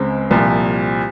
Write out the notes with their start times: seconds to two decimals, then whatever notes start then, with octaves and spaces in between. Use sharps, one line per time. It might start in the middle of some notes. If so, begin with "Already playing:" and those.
Already playing: C#2 C#3 G#3 C4
0.31 C2 A#2 F3